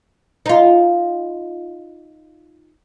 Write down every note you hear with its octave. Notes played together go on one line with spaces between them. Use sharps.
D#4 F4